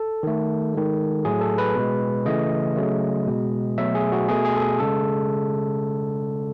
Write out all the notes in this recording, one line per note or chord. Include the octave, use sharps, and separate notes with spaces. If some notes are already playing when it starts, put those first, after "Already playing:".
Already playing: A4
D#3 A3
D#3 G#3
A2 F#3 A3 G#4
A4
B4
B2 G#3
C#3 E3 A3 D#5
C#3 F#3 A3
B2 G#3
B2 F#3 A3 E5
G#4
F#4
B2 A3 G#4
G#4
A4
G#4
C#3 G#3 A4